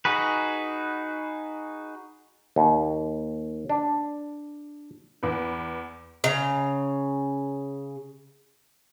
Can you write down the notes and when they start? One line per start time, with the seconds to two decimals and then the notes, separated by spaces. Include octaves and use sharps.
0.05 D#4 F#4 G#4 B4
2.56 D#2
3.70 D4
5.23 E2 B4
6.24 C#3 A#5